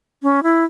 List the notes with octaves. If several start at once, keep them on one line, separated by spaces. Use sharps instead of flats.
C#4
E4